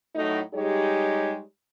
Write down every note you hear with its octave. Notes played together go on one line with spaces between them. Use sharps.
A2 F#3 D#4
G3 G#3 D#4 G4 G#4 C#5